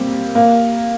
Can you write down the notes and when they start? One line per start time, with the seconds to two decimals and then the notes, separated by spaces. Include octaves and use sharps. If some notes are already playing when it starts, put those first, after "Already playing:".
Already playing: G3 A#3 C4 G4
0.35 A#3